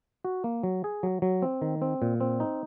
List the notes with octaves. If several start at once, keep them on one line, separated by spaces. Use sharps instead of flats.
F#4
A#3
F#3
G#4
F#3
F#3
C4
D#3
C4
A#2
C4
D#4